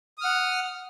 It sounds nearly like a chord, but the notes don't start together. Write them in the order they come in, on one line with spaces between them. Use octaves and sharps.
D#6 F6 F#5